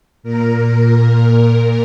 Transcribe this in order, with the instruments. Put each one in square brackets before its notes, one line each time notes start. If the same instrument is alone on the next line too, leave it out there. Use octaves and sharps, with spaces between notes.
[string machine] A#2 A#4